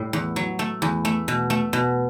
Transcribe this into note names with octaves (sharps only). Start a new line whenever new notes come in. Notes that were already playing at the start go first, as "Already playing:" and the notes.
Already playing: A2 G3
E2
F#3
A3
E2
A3
B2
A3
B2